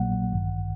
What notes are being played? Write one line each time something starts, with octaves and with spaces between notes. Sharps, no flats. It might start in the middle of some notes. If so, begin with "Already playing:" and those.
Already playing: A#1 A#2 F#3 A#3 F#5
A1 G2 D#3